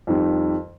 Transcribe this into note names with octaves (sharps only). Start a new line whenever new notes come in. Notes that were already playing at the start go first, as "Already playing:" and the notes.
F2 D#3 G3